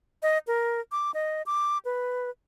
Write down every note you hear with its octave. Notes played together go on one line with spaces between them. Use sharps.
D#5
A#4
D6
D#5
D6
B4